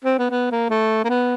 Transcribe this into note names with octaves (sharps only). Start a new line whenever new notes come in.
C4
B3
B3
A#3
A3
A#3
B3